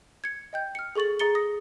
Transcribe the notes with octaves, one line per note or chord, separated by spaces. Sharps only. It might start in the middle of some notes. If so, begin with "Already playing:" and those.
G#6 C#7
D#5 G5 G6
F6 C#7
G#4 A4 C#6 A6 F#7
G#4 A#5 A6 C#7 G7
D#6 A#6